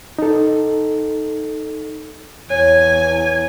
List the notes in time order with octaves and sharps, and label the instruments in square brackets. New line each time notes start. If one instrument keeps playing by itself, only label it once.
[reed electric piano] D#4 A4
[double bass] E2 [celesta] C#5 [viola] G#5